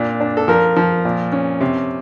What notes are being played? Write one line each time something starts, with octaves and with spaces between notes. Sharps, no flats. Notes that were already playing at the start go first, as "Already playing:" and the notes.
Already playing: A#2 D4
D4
A4
F3 A#4
F3
A#2
C#4
C3